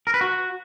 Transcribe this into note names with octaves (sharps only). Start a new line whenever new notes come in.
A#4
B4
F#4